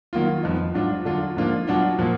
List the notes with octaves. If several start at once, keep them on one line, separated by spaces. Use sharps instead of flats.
D#3 F#3 A#3 F4
F2 F3 B3 D#4
G#2 F#3 D4 F4
D3 F#3 D4 F4
G#2 F3 A#3 D4 F4
B2 F#3 D4 F4
A#2 F3 A#3